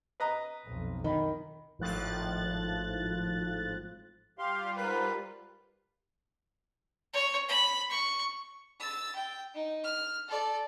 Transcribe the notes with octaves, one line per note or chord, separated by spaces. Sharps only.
B4 D#5 A#5
B1 F2
D#3 D#5 B5
G#1 A2 F3 F#6 A6
G3 F4 G4 F5 C6
G#2 A#4 B4
C#5
B5
C#6
E6 A6
G5
D#4
F6
A4 D5